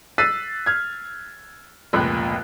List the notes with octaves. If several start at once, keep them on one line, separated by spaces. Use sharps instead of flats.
E6 F#6 A6 B6 C7 D#7
F6 G#6
F1 C#2 A#2 F#6